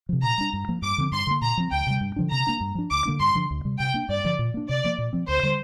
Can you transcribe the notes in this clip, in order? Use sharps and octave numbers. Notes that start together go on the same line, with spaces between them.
C3 F3
A#2 A#5
G3 D4
G2
F3 A#3
G2 D6
D3 F3 C4
G2 C6
D3 A#3
A#2 A#5
F3 C4
D2 G5
C3 G3
G2
D3 F3 D4
C3 A#5
A#3 D4
G2
F3 D4
D2 D6
D3 A#3 D4
G2 C6
D3 F3 D4
D2
C3 G3
C3 G5
A#3 D4
G2 D5
D3 F3
A#2
A#3 D4
C3 D5
F3 A#3
A#2
F3 C4
D2 C5
D3 G3